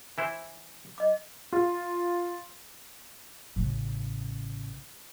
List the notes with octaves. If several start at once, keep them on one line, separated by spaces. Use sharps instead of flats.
E3 E4 C5
D#5 D6
F4
A1 C#3